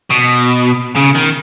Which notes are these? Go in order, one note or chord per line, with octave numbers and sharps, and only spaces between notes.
B2
C#3
D#3